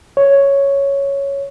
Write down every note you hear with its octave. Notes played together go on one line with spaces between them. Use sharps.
C#5